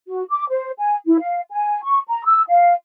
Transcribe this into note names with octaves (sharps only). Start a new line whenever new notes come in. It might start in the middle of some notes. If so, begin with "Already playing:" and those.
F#4
D6
C5
G#5
E4
F5
G#5
C#6
A#5
E6
F5